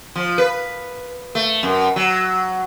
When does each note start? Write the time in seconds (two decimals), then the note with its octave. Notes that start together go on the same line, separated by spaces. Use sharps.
0.15 F3
0.38 B4
1.35 A3
1.63 F#2
1.96 F#3